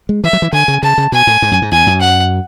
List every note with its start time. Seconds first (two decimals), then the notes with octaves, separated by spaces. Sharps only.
0.09 G#3
0.24 E3 E5
0.33 F#3
0.42 E3
0.53 D3 G#5
0.68 C#3
0.83 C#3 A5
0.98 C#3
1.12 B2 G#5
1.27 A2
1.42 G#2
1.51 F#2
1.62 G#2
1.72 E2 G#5
1.87 F#2
2.01 F#5